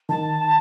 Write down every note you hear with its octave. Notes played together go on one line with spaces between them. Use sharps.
D#3 A5